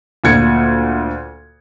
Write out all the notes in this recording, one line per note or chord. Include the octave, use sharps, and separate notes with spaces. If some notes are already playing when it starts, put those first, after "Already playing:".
D2 A#2 G#6 C#7